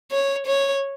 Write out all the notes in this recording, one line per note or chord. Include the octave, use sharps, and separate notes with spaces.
C#5
C#5